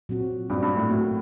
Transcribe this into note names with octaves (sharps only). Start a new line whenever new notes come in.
A#2 F#3 C4 F#4
G2 A#2 F#3 C4 F#4
G2
A2
A2 A#3 F#4 A#4